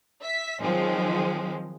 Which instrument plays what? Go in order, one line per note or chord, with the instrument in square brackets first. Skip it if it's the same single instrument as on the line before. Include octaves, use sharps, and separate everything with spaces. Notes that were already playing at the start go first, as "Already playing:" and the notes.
[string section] E5 B6
D#3 F3 F#3 G#3 C4